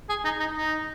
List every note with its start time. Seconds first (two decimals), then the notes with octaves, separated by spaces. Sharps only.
0.09 G#4
0.25 D#4
0.39 D#4
0.55 D#4